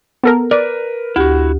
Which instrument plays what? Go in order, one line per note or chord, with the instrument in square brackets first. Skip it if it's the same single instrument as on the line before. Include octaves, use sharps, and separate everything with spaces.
[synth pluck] B3 A4 A#4
[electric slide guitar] A#4 B4 [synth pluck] D5
[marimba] D2 G4 [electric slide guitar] E4 F#4